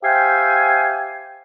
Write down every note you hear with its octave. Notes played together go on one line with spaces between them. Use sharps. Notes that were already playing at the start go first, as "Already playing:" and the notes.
G4 C5 E5 F5 G5 G#5